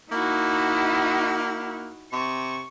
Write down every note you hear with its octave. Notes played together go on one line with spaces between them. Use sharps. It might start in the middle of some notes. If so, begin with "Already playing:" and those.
A#3 D#4 E4 F#4
C3 C#6